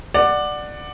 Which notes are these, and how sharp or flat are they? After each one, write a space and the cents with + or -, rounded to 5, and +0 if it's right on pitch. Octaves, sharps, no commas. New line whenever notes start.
D5 +15 F#5 +0